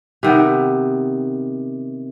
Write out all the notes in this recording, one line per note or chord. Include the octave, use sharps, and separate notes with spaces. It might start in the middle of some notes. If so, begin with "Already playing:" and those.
C3 D#3 B3